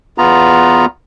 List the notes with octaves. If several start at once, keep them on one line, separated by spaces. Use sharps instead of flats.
E2 B3 F4 A#5